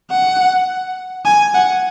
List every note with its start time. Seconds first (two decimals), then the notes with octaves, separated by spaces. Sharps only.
0.11 F#5
1.25 G#5
1.54 F#5